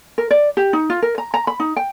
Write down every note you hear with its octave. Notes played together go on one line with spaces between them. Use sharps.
A#4
D5
G4
D#4
F4
A#4
A#5
A#5
B5
D#4
G5